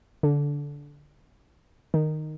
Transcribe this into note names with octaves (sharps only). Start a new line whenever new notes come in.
D3
D#3